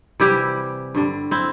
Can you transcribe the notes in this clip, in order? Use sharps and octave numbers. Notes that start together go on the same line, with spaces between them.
C3 E3 G3 E4 G4
G2 D3 G3
C4 E4